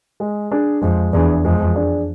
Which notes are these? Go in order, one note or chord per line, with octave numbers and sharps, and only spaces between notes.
G#3
D4 G#4 D5
F2 G#3
E2 D4 G#4 D5
F2 G#3
D4 G#4 D5